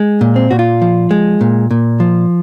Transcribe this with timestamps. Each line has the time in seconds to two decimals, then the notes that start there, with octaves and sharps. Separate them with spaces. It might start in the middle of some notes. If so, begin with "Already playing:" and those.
Already playing: G#3
0.21 A#2
0.36 C4
0.51 A#2 F#4
0.59 F4
0.82 F3
1.11 G#3
1.41 A#2
1.71 A#2
2.00 F3